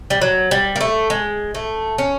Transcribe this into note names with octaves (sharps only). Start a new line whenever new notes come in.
G3
F#3
G3
A#3
A3
G#3
A3
C#4